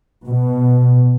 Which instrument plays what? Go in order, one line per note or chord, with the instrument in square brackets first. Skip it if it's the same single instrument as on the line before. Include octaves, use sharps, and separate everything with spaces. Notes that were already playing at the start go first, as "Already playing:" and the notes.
[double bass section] B2